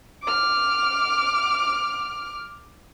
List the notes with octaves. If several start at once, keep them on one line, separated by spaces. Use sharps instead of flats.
D6 F6